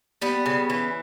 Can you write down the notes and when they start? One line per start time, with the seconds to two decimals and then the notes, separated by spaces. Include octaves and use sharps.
0.21 G3 B3
0.46 C#3
0.70 E3